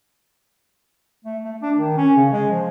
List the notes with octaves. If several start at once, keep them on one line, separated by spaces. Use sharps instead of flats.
A3
A3
D4
D#3
C#4
C#3
G#3
F3